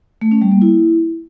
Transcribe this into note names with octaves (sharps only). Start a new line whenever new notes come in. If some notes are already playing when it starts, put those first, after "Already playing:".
A3
C#4
G3
A#3
E4